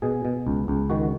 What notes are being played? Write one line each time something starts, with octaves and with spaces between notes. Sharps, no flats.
B2 G#4
B2
C#2
C#2
D#3 F#4